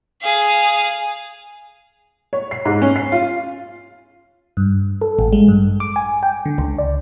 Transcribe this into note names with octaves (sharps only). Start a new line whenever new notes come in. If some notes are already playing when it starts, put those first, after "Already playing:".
G#4 F5
C#5
C7
G#2
C#4
C7
F4
G2
A4
A1
G#3
G2
D6
G#5
G5
D3
C#2
D5